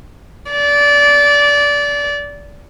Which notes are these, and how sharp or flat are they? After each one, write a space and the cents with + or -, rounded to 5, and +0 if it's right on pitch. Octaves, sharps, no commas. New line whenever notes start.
D5 -20